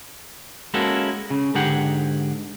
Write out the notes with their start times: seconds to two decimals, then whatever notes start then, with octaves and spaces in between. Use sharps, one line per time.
0.74 G#3 A#3 C#4 E4 F#4 A4
1.30 C#3
1.55 G#2 D3 D#4 G4 G#4 F#5